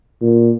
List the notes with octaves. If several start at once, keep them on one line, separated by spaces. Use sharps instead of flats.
A#2